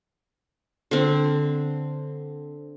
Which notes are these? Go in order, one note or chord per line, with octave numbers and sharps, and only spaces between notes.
D3 C4